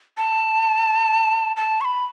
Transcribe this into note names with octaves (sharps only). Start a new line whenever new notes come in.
A5
A5
C#6
B5